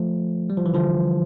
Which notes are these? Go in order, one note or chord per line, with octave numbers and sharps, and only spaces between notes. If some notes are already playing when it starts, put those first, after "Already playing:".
Already playing: F3 A3
G3
F3
E3
D3 F3